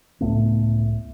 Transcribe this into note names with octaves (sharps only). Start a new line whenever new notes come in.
C#2 A2 A3 B3